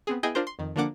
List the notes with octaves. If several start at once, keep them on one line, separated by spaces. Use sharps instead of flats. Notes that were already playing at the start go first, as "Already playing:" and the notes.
B3 C4 G#4
B3 E4 G#4 D#5 G5 G#5
D4 F4 A#4 C5
C6
F2 D#3
D3 F3 A#3 D4 F#5 D6